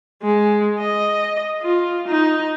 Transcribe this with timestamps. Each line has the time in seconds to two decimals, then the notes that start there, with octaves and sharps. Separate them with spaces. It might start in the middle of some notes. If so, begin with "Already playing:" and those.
0.23 G#3
0.79 D#5
1.62 F4
2.08 D#4